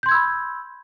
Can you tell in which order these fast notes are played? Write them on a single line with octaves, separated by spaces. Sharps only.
G6 C6 G#6 E6 B5